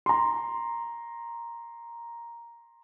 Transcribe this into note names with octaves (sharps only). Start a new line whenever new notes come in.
A#5 C6